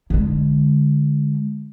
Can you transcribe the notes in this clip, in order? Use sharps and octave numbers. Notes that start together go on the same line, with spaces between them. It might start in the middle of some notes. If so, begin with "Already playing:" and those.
D3 G#3